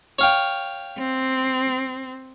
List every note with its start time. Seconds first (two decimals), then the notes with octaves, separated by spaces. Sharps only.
0.19 C#5 F5 G5
0.99 C4